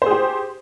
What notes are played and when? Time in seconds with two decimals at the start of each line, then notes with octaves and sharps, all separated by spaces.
0.02 C5
0.06 G#4
0.11 G4